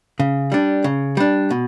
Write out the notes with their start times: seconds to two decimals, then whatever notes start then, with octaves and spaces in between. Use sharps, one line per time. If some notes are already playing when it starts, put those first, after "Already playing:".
0.20 C#3
0.52 G3 D4
0.84 C#3
1.17 G3 D4
1.50 B2